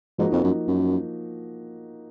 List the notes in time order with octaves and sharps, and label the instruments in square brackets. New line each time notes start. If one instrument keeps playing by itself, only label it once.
[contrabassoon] G#2 [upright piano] F3 A#3 D#4 F#4
[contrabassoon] F2
F#2
F#2